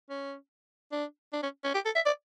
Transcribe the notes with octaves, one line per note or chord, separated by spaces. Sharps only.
C#4
D4
D4
C#4
C#4
G4
A4
E5
D5